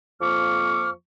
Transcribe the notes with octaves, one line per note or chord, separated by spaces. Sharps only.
F2 F3 A#3 C#6 D6 F6